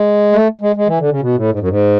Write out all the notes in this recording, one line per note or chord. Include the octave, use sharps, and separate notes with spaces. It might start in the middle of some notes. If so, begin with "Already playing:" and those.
Already playing: G#3
A3
G#3
G#3
E3
D3
C#3
B2
A2
G#2
F#2
G#2